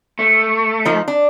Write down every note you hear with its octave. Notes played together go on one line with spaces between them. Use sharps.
A3
F3 D#4
D4